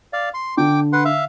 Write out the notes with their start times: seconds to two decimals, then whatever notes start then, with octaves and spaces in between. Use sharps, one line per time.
0.13 D5 F5
0.34 C6
0.57 D3 G5 D6
0.93 B4 F#5 C6
1.05 E5 F5